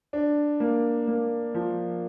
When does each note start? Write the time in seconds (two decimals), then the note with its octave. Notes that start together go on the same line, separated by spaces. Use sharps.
0.13 D4
0.60 A#3
1.07 A#3
1.54 F3